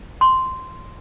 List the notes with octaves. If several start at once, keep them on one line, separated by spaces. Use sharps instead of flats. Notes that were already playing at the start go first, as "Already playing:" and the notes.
C6